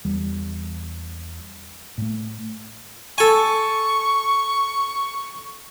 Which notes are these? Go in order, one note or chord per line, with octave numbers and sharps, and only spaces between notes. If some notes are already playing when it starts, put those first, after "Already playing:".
E2 E3 G3
A2 A3
A4 G#5 C#6